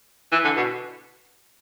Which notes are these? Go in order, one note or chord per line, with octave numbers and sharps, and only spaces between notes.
E3
D3
B2